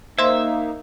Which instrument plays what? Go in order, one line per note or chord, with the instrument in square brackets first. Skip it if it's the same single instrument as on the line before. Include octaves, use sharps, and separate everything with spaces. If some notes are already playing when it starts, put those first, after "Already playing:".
[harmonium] A#3 D#4 [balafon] C5 C6 [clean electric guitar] E5